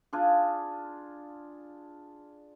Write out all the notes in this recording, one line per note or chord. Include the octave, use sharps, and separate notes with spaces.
D4 F4 G#4